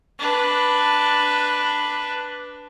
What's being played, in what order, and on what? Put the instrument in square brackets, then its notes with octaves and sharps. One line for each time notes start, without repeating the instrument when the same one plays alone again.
[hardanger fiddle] D4 B4